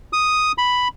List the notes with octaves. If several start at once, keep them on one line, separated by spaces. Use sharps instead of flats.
D#6
B5